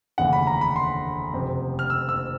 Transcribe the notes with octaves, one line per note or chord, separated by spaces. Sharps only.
F1 D#2 C#3 E3 F#5
B5
A#5
B5
C6
F#1 F2 C3
F6
E6
E6